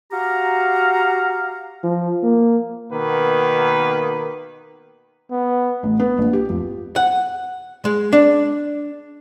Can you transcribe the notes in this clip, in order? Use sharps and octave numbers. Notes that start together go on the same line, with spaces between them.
F#4 G4 F5 A#5
F3
A#3
B2 D#3 A#3 B3 B4
B3
A1
B3
A#1
G4
F2
F#5
G#3
D4